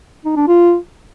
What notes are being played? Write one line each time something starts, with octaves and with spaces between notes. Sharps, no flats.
D#4
D4
F4